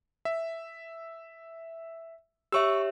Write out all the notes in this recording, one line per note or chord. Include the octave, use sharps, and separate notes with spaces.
E5
G4 C#5 E5 C#6 E6